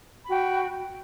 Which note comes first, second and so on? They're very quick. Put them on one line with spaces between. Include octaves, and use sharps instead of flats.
B5 F#4 G5